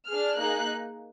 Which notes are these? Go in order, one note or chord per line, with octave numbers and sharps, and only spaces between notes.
D4 G#4 F6
A#3 D#4 G#4 F#6